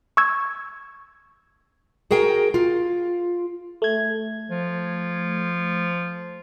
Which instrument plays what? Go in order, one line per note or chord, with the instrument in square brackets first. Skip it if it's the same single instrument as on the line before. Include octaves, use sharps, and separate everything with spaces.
[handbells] C#6 E6 G#6
[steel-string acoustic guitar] F#4 G#4 A#4 G5
F4
[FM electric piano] A3 G#6
[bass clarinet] F3